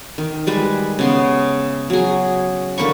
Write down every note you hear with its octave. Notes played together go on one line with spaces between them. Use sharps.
D#3
G3 G#3 B4
C#3 B3 C6
F#3 G#4
D3 A#3 B5 C#6